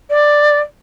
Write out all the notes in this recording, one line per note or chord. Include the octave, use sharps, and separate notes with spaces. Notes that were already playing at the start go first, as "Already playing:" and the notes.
D5